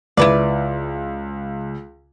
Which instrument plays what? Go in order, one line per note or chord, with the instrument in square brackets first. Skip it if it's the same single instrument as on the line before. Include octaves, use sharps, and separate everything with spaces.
[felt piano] C#2 [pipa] E4 B4 D5